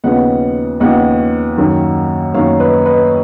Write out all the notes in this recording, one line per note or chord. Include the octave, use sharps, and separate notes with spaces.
D#2 C#3 F3 B3 D#5 F#5
D#2 C#3 F3 B3 D#5 F#5
F#2 D#3 A#3
F#2 D#3 A#3 C#5 F5
B4 D#5
B4 D#5